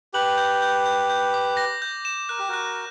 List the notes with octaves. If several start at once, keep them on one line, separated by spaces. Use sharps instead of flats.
G4 B4 F#7
G6
G6
G6
G6
D6
A#6
G6
E7
A#4 F#6
G4
F#4 A#4 F#6